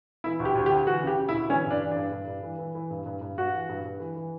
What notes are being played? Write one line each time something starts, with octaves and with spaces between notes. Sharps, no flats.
E3 E4
D2
G4
D2
G4
D2
E3 F#4
C#3 G4
C#3
E4
D2
E3 C#4
G2
D4
E3
G2 D4
G2
G2
E3
E3
E3
G2
G2
G2
G2 F#4
E3
G2
G2
E3
E3